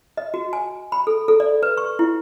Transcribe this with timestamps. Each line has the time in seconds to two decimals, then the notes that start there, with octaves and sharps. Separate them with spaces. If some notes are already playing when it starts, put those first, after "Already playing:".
0.17 D#5
0.34 F#4
0.53 G#5
0.92 B5
1.07 A4
1.28 A4
1.40 D5
1.63 B4
1.77 C#6
1.99 E4